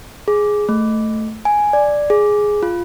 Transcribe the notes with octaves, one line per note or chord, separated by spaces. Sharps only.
G#4
A3
G#5
D5
G#4
F4